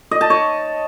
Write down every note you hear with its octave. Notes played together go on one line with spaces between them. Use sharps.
D#5
A5
C#5